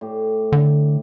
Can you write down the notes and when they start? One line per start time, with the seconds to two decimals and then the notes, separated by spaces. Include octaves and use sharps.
0.01 A2 G4
0.52 D3